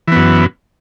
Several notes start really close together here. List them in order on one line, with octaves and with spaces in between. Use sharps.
E3 B3 F#2